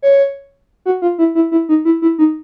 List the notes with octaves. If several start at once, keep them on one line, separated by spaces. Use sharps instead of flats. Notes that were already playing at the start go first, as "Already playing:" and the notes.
C#5
F#4
F4
E4
E4
E4
D#4
E4
E4
D#4